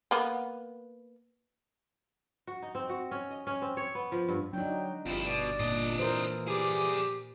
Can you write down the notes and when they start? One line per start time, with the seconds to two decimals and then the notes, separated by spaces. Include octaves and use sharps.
0.11 A#3 B3
2.47 F#4
2.62 D#4
2.75 C4
2.89 F#4
3.11 C#4
3.31 D#5
3.47 C#4
3.62 C4
3.77 C#5
3.95 B3
4.12 F3
4.29 G2
4.53 F#3 D4 D#4 G5
5.06 G1 F2 E4 F4
5.26 B2 D5
5.60 A#2 D4 D#5
5.99 E3 A#4 C5
6.47 G4 G#4 D5